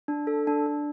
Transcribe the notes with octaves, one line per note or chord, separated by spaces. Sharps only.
D4
A4
D4
D4